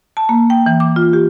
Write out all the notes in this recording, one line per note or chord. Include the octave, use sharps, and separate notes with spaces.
A5
A#3
G5
E3
D6
F4
G4